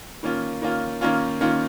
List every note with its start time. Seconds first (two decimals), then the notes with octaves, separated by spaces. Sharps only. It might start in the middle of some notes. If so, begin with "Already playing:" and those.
0.23 D#3 A#3 C#4 F4
0.62 D#3 A#3 C#4 F4
1.01 D#3 A#3 C#4 F4
1.41 D#3 A#3 C#4 F4